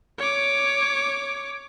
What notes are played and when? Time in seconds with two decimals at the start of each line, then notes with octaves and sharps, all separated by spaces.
0.18 C#5 D6